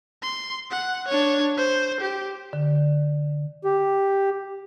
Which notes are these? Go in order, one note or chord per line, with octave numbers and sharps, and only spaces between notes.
C6
F#5
D4 C#5
C5
G4
D3
G4